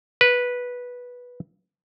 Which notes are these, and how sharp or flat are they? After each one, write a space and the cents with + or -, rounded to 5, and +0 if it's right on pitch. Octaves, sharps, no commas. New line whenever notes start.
B4 -10